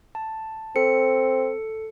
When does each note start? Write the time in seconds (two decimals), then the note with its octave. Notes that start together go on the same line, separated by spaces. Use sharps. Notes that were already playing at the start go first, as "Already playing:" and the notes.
0.15 A5
0.76 C4 A4 C#7